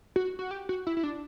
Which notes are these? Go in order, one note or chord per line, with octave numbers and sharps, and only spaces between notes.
F#4
F#4
G4
F#4
E4
E4
D4